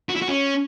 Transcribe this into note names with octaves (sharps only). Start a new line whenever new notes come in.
F#4
E4
F#4
C#4